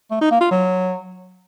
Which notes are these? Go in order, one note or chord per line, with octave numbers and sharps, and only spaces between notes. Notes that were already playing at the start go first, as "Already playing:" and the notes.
A3
D#4
A#3
F4
F#3